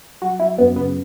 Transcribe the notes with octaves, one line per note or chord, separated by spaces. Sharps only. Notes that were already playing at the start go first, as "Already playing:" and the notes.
F#3 F#4
F#3 E4
F#2 B3
C#3 B3